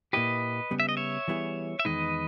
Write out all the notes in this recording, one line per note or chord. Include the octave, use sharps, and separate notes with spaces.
A#2 A#3 E4 G4 B4 D#5
C#3 G3 B3
E5
D#5
C#5 E5
E3 G3 B3 E4 G#4
E5
E2 D#3 G#3 D#4 B4 D#5